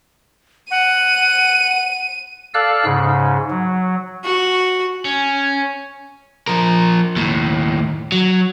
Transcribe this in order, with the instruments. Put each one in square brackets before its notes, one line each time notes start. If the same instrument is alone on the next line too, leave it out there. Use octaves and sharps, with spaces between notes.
[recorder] F#5 [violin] D#7
[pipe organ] A4 D5 F5 E6 F#6
G#2 C#3
F#3
[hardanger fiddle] F#4
[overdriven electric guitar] C#4 [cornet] G#5
[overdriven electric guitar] F3 A#4
D#2 A2
F#3